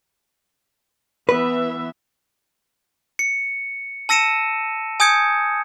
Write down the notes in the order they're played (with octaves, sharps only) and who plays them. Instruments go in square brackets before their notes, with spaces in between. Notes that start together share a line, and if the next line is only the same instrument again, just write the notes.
[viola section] E3 B3 E5 [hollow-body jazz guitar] B4
[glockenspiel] C#7
A5 E6 A#6 C#7 D#7 E7
G#5 D#6 G6 G#6 C#7